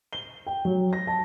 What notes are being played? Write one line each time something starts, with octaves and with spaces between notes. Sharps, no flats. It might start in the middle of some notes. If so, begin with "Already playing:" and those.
G7
G5
F#3
A#6
A5